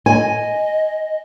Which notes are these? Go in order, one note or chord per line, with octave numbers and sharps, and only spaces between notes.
D#5 G#5